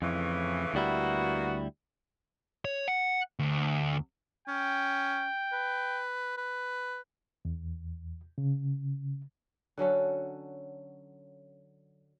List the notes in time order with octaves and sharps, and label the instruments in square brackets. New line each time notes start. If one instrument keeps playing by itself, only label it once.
[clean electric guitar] F2 [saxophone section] A2 C#3 E3
[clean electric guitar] D2 G3 E4 [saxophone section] A#3 B3 F#4
[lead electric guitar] C#5
F#5
D2
[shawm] C#4 [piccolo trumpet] G5
[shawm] B4
B4
[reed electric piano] E2
C#3
[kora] D3 F#3 C#4 A4